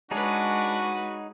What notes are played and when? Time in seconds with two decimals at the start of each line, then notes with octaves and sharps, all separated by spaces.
0.11 G#3 D4 D#4 F#4 G#4 B4 C#5